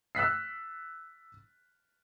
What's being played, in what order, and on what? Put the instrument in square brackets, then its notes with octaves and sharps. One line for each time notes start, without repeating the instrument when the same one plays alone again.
[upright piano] E6 F#6 B6 C7